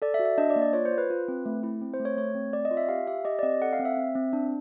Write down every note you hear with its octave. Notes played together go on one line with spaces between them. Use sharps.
A4 D5
E5
F#4
E5
D4 D#5
D5
A#3
D5
F4 C#5
C5
F4
B4
F4
C4
A3
E4
C4
C5
A3
C#5
A3 C#5
C4
C4 D5
D#5
F4
E5
G4 F5
G4 E5
G4 D#5
D5
C4 D#5
A4 F#5
F5
C4
E5
C4
C4
D4